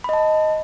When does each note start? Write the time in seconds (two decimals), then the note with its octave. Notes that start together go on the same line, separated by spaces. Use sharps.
0.04 B5
0.09 D#5
0.13 A5